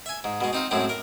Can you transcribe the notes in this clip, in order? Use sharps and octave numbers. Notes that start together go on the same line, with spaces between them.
E5 G#5
G#2
B2 G#3
C4 D#4 F4
F#2 A2 G#3 C4
A#4